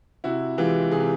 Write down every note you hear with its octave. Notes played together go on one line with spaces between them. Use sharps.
C3 E4 F#4
E3 G#3 F4 G4
C3 G#4
G4